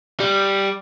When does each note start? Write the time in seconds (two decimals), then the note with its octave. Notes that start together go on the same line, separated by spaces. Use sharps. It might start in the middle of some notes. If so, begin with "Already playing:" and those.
0.20 G3